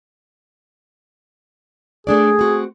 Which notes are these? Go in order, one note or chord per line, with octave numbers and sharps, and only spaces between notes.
A3 D4 G#4 D5
C4 F#4